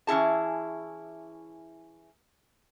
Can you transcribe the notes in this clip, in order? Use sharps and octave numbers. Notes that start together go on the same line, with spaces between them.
E3 C#4 E4 G#4 A5